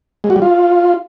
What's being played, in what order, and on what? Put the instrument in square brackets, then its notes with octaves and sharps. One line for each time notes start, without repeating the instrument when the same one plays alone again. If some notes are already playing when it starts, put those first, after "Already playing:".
[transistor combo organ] G#3
F#4
G3
F4